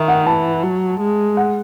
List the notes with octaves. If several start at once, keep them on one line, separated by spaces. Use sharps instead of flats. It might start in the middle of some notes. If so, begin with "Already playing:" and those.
Already playing: D#3 E5
F#5
E3 A5
F#3
G#3
F#5